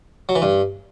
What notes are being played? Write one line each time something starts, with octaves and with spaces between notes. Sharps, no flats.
F#3
E3
G2